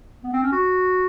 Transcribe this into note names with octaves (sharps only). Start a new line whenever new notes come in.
B3
C4
C#4
F#4